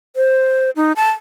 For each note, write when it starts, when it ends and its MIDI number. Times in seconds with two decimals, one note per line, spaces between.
0.16 0.70 72
0.76 0.92 63
0.96 1.11 81